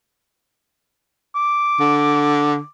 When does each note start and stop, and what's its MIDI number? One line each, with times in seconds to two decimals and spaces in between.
1.35 2.69 86
1.80 2.59 50